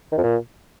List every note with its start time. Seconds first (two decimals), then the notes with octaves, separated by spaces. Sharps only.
0.12 D#3
0.18 F2
0.23 A#2